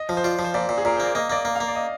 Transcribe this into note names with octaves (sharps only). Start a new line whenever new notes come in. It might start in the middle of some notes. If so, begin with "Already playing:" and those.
Already playing: D#5
F3
C5
F4 D5
F3
C5
A#2 D5
A#2
G#4
A#2 A#4
A#3 C5
D5
A#3 D#5
A#3 D5
D#5
A#3
F5
A#3
D5
D#5